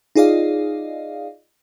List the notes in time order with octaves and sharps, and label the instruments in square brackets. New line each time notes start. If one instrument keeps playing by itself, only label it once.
[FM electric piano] D#4 F4 G#4 D5 D#5 F5